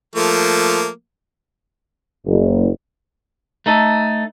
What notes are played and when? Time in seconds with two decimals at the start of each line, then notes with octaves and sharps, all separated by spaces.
0.16 F3 A3 A#3
2.27 F#1
3.66 A3 D#4 A4